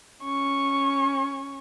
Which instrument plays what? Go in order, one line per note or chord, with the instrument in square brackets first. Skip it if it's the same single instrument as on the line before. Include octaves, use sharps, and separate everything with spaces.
[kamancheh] C#4 C#6